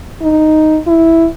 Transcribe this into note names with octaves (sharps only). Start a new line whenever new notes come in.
D#4
E4